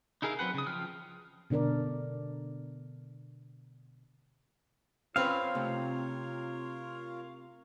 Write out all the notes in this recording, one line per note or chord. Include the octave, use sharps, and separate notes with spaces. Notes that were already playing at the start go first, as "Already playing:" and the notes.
D#4 E4 G#4 A#4 F5
F#3 C4 B4 F#5
C#3 D#6
F3 F4 G5 F6
B2 D3 D4 A#4 D5
C4 C#4 E4 F4 A#4 B4 C#5 F5
C3 A3